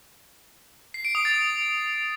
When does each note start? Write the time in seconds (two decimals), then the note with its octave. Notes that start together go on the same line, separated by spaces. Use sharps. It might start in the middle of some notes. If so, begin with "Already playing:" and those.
0.94 C7
1.05 D7
1.15 D#6
1.25 A6